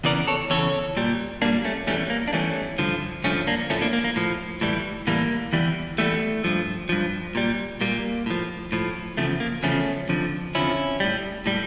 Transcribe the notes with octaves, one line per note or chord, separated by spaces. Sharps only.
E2 C#3 E3 A#4 D5
A4 C#5
E2 C#3 E3 A4 C#5
A#2 G3
A#2 G3 A#3 D4
A3 C#4
E2 E3 G3 A3 C#4
A#3
D4
E2 E3 G3 A3 C#4
G2 D3 F3
G2 D3 F3 A3 C#4
A#3 D4
A2 F3 A3 C#4
A#3 D4
A#3
A#3
A2 F3
A2 E3 G3
A2 E3 G3 A#3
E2 E3 G3
E2 E3 G3 A3
G2 F3
G2 F3
A#2 G3
A#2 G3 A#3
A2 F3
A2 F3
E2 C#3 F3 A3
A#3
E2 C#3 F3 A3 C#4
F2 D3 F3
F2 D3 F3 C#4 E4
A2 G3
A2 G3